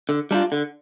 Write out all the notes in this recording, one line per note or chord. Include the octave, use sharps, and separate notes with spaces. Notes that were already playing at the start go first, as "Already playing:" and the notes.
D3
G3 D4 F4
D3